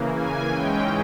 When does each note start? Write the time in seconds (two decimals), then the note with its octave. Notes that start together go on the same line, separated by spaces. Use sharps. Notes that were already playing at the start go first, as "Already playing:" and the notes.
Already playing: C#3 E3 A#3
0.14 G#5
0.51 G#2 E3 G#3 C#4 G5